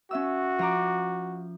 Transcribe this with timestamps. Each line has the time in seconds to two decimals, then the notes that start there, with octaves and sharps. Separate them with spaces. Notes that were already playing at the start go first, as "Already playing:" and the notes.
0.11 C#4 F#4 E5 E6
0.59 F3 A#5 D6